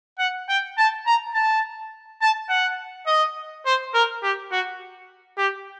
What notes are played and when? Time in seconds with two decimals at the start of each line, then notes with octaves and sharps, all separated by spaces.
0.19 F#5
0.49 G5
0.78 A5
1.07 A#5
1.34 A5
2.22 A5
2.49 F#5
3.07 D#5
3.66 C5
3.94 A#4
4.23 G4
4.52 F#4
5.38 G4